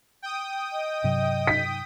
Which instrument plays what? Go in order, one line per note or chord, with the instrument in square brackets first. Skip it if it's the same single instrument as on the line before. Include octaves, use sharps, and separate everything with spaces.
[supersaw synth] G5 D#6
[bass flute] D#5
[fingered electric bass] G2 C3 F#3
[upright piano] B6